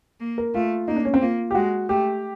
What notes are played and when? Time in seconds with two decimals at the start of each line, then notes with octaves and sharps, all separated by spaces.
0.20 A#3
0.38 A#4
0.54 A3 F4
0.88 A#3 D#4
0.96 D4
1.05 C#4
1.14 C4
1.21 A#3 F4
1.51 G4
1.55 G#3 F#4
1.89 A3 G4